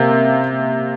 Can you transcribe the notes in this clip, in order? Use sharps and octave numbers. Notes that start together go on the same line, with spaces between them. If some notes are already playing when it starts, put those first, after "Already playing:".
Already playing: C3 A#3